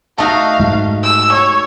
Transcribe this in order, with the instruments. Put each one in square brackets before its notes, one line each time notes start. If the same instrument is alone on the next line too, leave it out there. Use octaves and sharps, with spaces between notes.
[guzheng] A3 D#4 F#4 [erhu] F5 [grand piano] A5 D#6
[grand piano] G#2 [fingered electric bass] G#3
[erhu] E6
[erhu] C#5 [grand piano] E6